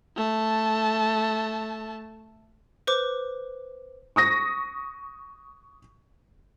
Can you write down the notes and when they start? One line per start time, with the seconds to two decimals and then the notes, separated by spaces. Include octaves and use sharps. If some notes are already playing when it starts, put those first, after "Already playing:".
0.16 A3 A5
2.87 B4 C5 D6
4.16 C#6 D#6 A#6